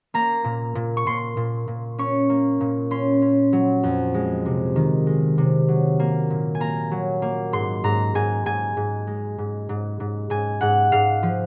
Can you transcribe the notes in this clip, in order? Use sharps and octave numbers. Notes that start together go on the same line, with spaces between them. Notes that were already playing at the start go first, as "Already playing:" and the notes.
A#3 A#5
A#2
A#2
C#6
A#2 C6
A#2
A#2
C#4 C#6
A#3
A#2
C#4 C6
C#4
F#3
F2
G#3
C3
D#3
G#3
C3
F#3
A#3
A#2
G#5
A#3 A#5
F#3
A#3
G#2 C6
G#2 A#5
G#2 G#5
G#2 G#5
G#2
G#3
G#2
G#2
G#2
G#2 G#5
G#2 F#5
G#2 F5
F3